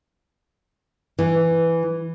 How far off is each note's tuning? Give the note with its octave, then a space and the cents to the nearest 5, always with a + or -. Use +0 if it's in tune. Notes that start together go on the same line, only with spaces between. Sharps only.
E3 +5